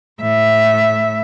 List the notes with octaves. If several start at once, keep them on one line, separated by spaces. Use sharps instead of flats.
A2 E5